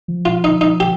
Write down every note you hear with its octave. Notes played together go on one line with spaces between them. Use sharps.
F3
F4
D#4
D#4
G4